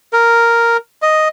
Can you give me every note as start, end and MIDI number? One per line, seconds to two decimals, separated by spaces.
0.13 0.77 70
1.02 1.28 75